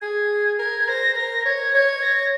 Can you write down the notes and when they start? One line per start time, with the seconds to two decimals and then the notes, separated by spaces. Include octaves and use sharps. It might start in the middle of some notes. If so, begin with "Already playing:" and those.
0.01 G#4 G#6
0.59 A#4 G#6
0.87 C5 A#6
1.16 A#4 A#6
1.45 C#5 G#6
1.73 C#5 G#6
2.02 A#6